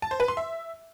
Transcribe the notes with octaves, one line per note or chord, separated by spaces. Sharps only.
A5
C5
B4
C6
E5